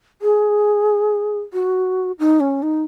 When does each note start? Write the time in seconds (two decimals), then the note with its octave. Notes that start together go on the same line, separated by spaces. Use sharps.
0.22 G#4
1.53 F#4
2.19 D#4
2.40 C#4
2.63 D#4